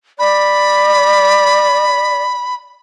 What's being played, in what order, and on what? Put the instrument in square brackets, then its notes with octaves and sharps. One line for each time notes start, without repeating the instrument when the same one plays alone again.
[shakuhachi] D5 [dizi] B5